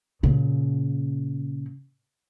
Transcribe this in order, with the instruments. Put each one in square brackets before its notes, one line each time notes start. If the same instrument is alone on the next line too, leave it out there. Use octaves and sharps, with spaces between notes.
[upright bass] A#2 C#3